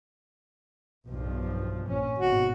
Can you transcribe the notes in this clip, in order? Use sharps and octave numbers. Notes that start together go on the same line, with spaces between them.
B1 G2 F3
A#1 C#4
G#1 B2 F#4